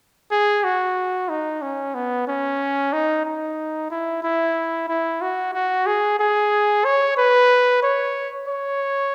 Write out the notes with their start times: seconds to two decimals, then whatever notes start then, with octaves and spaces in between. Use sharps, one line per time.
0.31 G#4
0.64 F#4
1.29 D#4
1.62 C#4
1.94 B3
2.27 C#4
2.92 D#4
3.25 D#4
3.91 E4
4.23 E4
4.88 E4
5.22 F#4
5.54 F#4
5.87 G#4
6.19 G#4
6.85 C#5
7.17 B4
7.83 C#5
8.48 C#5